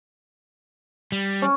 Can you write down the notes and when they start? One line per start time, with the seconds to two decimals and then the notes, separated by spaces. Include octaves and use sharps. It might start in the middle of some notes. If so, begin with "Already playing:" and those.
1.12 G3
1.42 C#4